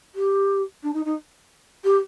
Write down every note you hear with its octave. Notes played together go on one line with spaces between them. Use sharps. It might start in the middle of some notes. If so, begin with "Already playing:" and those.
G4
D4
D#4
D#4
G4